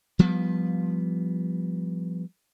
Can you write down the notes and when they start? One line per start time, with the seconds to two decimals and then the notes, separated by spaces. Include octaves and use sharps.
0.19 F3 G3 B3